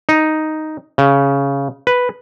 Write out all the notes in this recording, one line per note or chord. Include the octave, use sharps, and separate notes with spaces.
D#4
C#3
B4